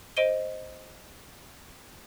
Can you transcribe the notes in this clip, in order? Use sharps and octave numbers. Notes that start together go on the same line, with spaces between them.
C5 D#5 D7 D#7 G7